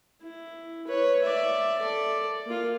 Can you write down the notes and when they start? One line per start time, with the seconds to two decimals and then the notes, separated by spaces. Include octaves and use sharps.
0.22 E4
0.87 B4 C#5
1.22 D5 E5
1.78 A4 D5
2.46 A#3 F4